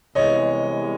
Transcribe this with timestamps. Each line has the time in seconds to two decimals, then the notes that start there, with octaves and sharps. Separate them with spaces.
0.15 C2 C3 E3 G#3 B3 C#5 D#5